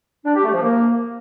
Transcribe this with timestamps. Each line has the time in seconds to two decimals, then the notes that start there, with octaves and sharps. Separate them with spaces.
0.25 D4
0.34 G4
0.44 A3
0.53 F3
0.63 A#3